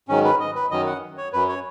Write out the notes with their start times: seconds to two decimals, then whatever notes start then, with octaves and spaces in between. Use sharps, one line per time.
0.09 G#2 D#3 F#3 C#4
0.25 B4
0.40 D#5
0.55 B4
0.71 F#2 D#3 F#3 D#5
0.87 F#5
1.18 C#5
1.33 F#2 F#3 B4
1.49 C#5